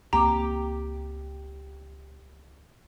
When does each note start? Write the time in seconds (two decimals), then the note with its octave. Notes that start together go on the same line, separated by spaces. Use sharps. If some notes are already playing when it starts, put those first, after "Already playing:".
0.13 C#2 A#3 C4 G4 A#5